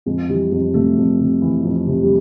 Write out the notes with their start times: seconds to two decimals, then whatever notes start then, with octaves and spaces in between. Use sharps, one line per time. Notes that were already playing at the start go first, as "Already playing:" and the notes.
0.06 F2 G#3
0.29 E3 G3
0.52 F2 G#3
0.74 C3 A3
0.97 F2
1.20 C3
1.42 E3
1.64 F2
1.87 C3
2.03 G3